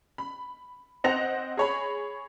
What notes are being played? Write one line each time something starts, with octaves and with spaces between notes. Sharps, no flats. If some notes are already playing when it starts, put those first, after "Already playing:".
B5
C4 C5 D#5 F#5 A#6 F7
G#4 C#5 B5